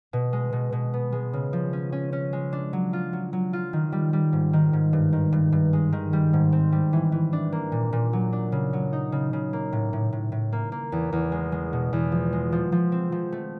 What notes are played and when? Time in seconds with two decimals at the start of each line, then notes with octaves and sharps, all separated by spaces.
0.13 B2
0.33 G#3
0.53 B2
0.72 B2
0.94 B3
1.12 G#3
1.33 C#3
1.53 F3
1.73 C#4
1.92 C#4
2.13 C#4
2.33 G#3
2.53 D4
2.73 F#3
2.93 F4
3.13 F#3
3.33 F#3
3.53 F4
3.73 D#3
3.92 G3
4.13 G3
4.33 G#2
4.53 D#3
4.73 G#2
4.93 G2
5.13 D#3
5.32 G2
5.52 G2
5.73 G#3
5.92 D#3
6.13 G3
6.33 G#2
6.52 C4
6.72 G3
6.93 E3
7.12 E3
7.33 D4
7.52 A#3
7.72 A#2
7.93 A#2
8.13 F#3
8.33 D4
8.52 C#3
8.73 F#3
8.93 D#4
9.12 C#3
9.33 C#3
9.53 A#3
9.73 A2
9.93 A2
10.13 A2
10.32 A2
10.52 A#3
10.72 A#3
10.92 E2
11.12 E2
11.32 G#3
11.52 G#3
11.73 B2
11.93 E2
12.12 F3
12.33 G#3
12.52 F3
12.72 F3
12.92 C4
13.12 F3
13.32 A3